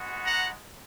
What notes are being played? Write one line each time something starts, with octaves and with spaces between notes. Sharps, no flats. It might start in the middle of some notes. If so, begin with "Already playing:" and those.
Already playing: G#3 B3 F#4
F#5 A#5